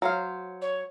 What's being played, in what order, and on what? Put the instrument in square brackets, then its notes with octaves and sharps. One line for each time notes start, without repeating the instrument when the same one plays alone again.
[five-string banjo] F#3 C5 F5
[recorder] C#5